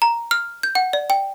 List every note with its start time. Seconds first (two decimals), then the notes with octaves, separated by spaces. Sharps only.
0.02 A#5
0.31 F6
0.63 G6
0.75 F#5
0.93 D5
1.10 G5